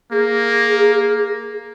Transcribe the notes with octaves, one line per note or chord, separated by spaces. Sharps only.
A#3 G#4